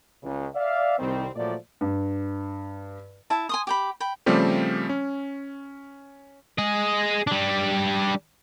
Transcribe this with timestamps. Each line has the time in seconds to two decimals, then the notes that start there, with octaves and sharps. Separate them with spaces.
0.23 C#2 C#3
0.55 D5 E5 F5
0.98 C2 D#3 G3 C4
1.36 A#2 F3 F#3 A3 D5
1.81 G2
3.30 E4 E5 A5
3.49 G#5 C6 D#6
3.67 G4 G5 B5
4.00 G5 B5
4.26 C#3 F3 G3 A3 C4 G4
4.89 C#4
6.58 G#4 D#5
7.27 G3 D4